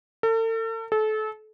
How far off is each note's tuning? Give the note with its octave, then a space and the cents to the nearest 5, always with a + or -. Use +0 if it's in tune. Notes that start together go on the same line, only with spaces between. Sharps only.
A4 +40
A4 -30